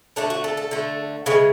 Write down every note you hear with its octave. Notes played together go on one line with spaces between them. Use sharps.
D3 A3 D4
F#4
A4
A4
D3 A3
C#3 E3 G#3